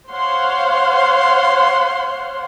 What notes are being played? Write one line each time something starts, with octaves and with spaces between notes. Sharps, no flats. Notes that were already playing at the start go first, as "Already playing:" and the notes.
C5 C#5 F5 F#5 C6